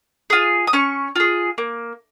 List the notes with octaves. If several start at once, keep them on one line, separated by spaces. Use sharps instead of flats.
F4 G#4
D#6
C#4 C#6
F4 G#4
A#3